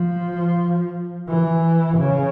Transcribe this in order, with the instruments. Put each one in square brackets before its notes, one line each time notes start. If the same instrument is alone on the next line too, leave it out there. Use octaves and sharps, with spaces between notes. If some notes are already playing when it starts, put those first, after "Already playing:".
Already playing: [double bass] F3
E3
C#3